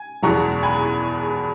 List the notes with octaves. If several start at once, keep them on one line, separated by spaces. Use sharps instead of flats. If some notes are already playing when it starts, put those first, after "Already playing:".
Already playing: G#5
F#1 E2 B2 G#3 A#5 C#6
G#5 B5